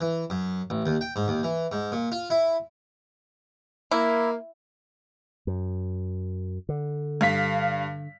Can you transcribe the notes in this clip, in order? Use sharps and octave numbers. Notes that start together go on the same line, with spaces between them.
E3
F#2
A1
D#2
G5
G#2
D#2
E3
G#2
A#2
F4
E4
A#3 E4
F#2
D3
G2 F5 B6